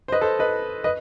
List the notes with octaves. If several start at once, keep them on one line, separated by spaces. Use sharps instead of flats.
C5
B4 D#5
A4 C5
B4 D#5
B4 D#5